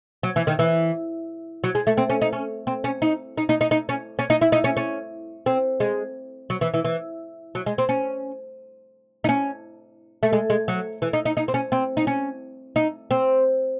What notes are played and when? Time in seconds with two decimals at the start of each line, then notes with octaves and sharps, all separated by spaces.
0.23 F#3
0.36 E3
0.47 D#3
0.59 E3
1.64 F#3
1.75 G#3
1.87 A3
1.98 C4
2.10 C#4
2.22 D#4
2.33 C#4
2.67 C4
2.84 C#4
3.02 D#4
3.38 D#4
3.49 D#4
3.61 D#4
3.71 D#4
3.89 C#4
4.19 C#4
4.30 D#4
4.41 E4
4.52 D#4
4.64 C#4
4.77 C#4
5.46 C4
5.80 G#3
6.50 F#3
6.61 E3
6.74 E3
6.85 E3
7.55 F#3
7.66 G#3
7.78 C4
7.89 C#4
9.24 D#4
9.29 C#4
10.23 A3
10.33 G#3
10.50 G#3
10.68 F#3
11.02 E3
11.13 D#4
11.25 D#4
11.37 D#4
11.48 C4
11.54 C#4
11.72 C4
11.97 D#4
12.07 C#4
12.76 D#4
13.11 C4